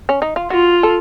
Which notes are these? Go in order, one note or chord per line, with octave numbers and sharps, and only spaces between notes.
C#4
D#4
F4
F4 F#4
A4